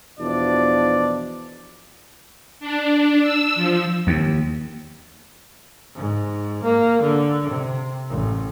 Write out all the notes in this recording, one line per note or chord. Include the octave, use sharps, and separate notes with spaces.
E2 B2 F3 D4 D5
D4
E6
F3
D#2
G#2
A#3
D3
C3
A1